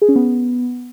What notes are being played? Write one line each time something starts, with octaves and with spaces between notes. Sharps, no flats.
G#4
C#4
B3